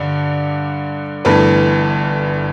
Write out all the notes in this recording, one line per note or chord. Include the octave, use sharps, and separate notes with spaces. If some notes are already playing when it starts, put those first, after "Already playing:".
Already playing: G2 D3 D5
G1 G2 E3 A3 B4